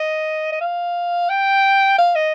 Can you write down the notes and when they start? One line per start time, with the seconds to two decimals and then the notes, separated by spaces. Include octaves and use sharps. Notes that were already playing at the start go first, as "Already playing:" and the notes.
Already playing: D#5
0.52 D#5
0.61 F5
1.30 G5
1.98 F5
2.15 D#5